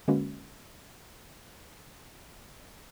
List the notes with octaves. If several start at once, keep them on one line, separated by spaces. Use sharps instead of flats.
D3 G#3 A#3 C#4 F#4 B4